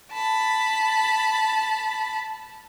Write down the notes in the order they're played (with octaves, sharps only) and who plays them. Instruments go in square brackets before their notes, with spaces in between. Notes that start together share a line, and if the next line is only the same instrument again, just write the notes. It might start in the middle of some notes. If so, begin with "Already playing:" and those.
[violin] A5 B5